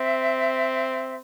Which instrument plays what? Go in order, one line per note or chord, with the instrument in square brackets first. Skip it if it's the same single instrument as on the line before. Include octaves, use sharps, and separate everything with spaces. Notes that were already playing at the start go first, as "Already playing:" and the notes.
Already playing: [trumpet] C4 [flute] E5